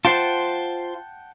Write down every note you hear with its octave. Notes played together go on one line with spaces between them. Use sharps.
F4 C5 F#5 G5 A5